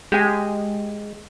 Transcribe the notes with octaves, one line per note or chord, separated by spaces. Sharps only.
G#3 G4 G#5